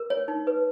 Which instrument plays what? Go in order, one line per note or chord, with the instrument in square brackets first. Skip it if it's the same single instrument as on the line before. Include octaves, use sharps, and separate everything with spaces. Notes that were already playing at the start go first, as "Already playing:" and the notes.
Already playing: [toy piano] A#4
C#5
D#4
B4